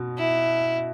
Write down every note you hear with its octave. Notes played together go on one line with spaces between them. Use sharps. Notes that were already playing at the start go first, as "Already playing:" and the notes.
Already playing: B2
E4